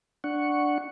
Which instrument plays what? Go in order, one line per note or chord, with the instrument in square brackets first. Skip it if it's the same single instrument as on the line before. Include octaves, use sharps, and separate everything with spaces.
[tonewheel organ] D4 F#5 C#6